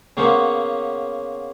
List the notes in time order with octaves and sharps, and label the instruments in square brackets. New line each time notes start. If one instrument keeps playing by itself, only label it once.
[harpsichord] C#3 A#3 B3 C#4 F#4 C5